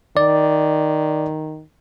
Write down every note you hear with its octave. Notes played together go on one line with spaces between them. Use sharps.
D#3 D5